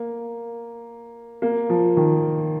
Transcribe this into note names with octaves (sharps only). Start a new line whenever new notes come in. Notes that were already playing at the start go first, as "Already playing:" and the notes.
Already playing: A#3
A#3
F3
D#3